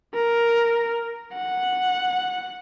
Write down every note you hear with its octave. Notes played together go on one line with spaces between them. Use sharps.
A#4
F#5